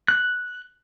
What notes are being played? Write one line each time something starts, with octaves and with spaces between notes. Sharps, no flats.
F#6